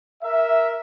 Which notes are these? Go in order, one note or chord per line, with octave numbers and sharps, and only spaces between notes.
A#4 E5